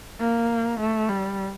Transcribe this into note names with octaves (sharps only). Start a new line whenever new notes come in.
A#3
A3
G3